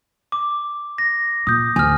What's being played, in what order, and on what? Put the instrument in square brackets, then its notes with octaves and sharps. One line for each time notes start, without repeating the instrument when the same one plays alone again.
[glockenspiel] D6
A#6
[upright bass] A#2 [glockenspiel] D#6 G6
[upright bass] D2 [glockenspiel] G#5 F6